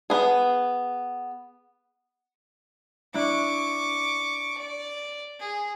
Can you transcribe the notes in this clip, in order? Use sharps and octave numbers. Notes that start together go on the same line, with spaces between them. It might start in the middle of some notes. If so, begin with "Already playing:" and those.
B3 G#4
D4 E4 C#6 D6
D5
G#4